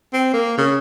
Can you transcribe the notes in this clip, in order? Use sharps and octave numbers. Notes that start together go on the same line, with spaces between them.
C4
A#3
C#3